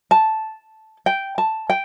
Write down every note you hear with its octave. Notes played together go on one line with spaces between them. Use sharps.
A5
G5
A5
G5